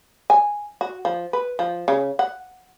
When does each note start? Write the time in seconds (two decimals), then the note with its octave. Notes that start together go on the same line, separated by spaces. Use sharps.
0.30 G#5
0.81 F#4
1.05 F3
1.33 B4
1.59 F3
1.88 C#3
2.19 F#5